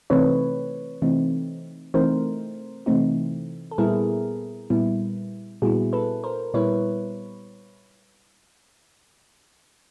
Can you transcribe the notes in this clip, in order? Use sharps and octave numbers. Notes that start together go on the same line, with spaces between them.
C3 E3 A3 C4 D#4 B4 C#5
C3 E3 A3 C4 D#4
C3 E3 A3 C4 D#4 A#4 C5
C3 E3 A3 C4 D#4
A4
A#2 G3 B3 E4 G#4 A#4
A#2 G3 B3 E4
A#2 G3 B3 E4 F#4 G#4
A4 B4
A#4 C5
A#2 G3 B3 E4 B4 C#5